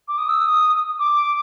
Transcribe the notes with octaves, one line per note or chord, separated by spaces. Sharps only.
D6
D#6
E6
D#6
D6